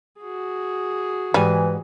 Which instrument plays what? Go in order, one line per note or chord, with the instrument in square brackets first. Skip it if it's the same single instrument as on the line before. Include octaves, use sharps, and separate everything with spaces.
[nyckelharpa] F#4 G#4
[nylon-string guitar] G#2 G#5 [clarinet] E3 [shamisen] G3